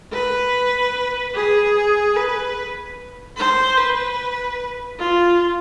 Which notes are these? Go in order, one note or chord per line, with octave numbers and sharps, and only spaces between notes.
B4
G#4
B4
C5
B4
F4